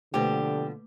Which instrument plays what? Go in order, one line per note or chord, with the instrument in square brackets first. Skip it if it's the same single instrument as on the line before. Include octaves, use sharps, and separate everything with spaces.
[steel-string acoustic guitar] B2 F3 [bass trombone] D3 [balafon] A3 A#3 B4 [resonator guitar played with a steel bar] G4